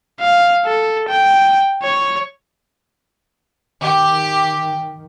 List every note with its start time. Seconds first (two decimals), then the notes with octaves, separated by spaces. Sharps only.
0.21 F5
0.66 A4
1.09 G5
1.83 C#5
3.83 D#3 G4